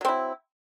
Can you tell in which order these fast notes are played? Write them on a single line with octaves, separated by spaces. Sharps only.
F#3 C4 E4